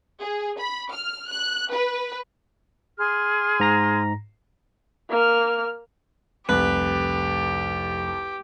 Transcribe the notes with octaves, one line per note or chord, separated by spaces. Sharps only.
G#4
B5
F6
F#6
B4
G#4 C6 F6
G#2 A#5 A#6
A#3 F6
F1 C2 G4 B4